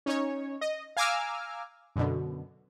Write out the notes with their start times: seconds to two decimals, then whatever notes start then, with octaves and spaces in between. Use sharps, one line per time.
0.06 C#4 D#4 C#5
0.61 D#5
0.97 F5 G#5 A#5 D6 E6 F6
1.96 F#2 B2 D3